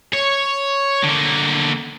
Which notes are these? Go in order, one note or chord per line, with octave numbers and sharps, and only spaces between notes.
C#5
D3 A#3